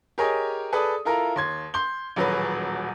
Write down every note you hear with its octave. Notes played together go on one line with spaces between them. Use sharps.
G4 G#4 A#4 C#5 D#5 G#5
G#4 A4 B4 D5 B5 D#6
E4 F4 A4 A#4 A#5
D#2 C6 G#6
C6 G6 G7
D#1 A1 F#3 F#4 G#4 B4